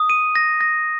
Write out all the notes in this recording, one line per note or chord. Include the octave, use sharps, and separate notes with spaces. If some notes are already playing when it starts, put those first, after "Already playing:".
Already playing: D#6
D#7
A#6
A#6